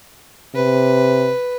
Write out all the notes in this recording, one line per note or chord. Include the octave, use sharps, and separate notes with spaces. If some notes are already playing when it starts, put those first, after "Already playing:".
C3 B4